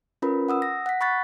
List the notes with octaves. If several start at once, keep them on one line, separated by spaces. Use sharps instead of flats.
C#4 F4 A#4 B4 B5
F#5 D#6 E6
A#6
F#5 B6
B5 C#6 F#6 A6 B6